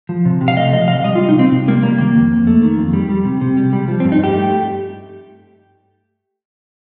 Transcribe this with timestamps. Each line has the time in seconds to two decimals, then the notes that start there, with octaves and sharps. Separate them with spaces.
0.09 F3
0.25 C3
0.41 C3
0.48 F5
0.56 A3 D#5
0.73 F3 D#5
0.88 C3 F5
1.04 G3 D#5
1.15 F4
1.20 G3
1.29 D#4
1.36 C3 C4
1.52 C3
1.68 G3 A#3
1.83 G3 A#3
1.98 D#3 A#3
2.15 F2
2.31 F2
2.47 A3
2.62 D#3
2.78 F2
2.93 G3
3.09 G3
3.25 C3
3.41 C3
3.57 G3
3.73 G3
3.88 F3
4.00 C4
4.04 G2
4.12 D#4
4.20 G2 G4
4.35 A3